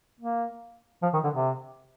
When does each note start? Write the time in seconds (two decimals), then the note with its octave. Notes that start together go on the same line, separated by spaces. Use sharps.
0.20 A#3
1.03 F3
1.13 D#3
1.24 D3
1.34 C3